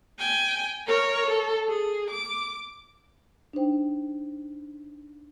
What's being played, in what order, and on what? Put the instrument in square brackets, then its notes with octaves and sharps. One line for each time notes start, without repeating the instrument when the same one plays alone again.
[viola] G5 G#5
A#4 C#5
A4
G#4
D6
[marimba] D4 D#4 C5 G5